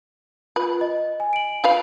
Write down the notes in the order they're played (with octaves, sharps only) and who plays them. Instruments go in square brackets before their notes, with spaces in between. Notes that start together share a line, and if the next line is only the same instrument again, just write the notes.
[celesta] F4 [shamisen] B4
[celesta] D#5
G#5
D7 F#7
[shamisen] F4 B4 F5